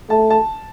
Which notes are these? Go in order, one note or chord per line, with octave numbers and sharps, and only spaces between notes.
A3 A5
A5